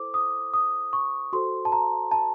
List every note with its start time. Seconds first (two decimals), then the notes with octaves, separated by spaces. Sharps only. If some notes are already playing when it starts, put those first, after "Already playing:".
Already playing: E4 A4 C5 D6
0.14 D#6
0.54 D#6
0.93 C#6
1.33 F#4 A4 C5 C6
1.65 A5
1.72 A#5
2.11 A5